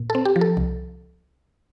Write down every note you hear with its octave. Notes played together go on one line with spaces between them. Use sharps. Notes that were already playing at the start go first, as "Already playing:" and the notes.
Already playing: A#2
A4
C4
G4
F3
A4
C2